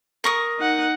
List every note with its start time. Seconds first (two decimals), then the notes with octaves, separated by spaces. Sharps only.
0.24 A#4 C#6 D#6
0.60 D#4 F#5